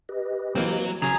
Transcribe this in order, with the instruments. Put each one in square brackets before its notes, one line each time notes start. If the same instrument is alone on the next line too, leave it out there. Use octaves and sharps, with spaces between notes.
[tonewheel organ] G4 B4 D#5
[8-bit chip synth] E3 A#3 C4 [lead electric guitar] F#3 F#4
[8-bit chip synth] C#3 F#3 [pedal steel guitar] G#4 [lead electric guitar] A#5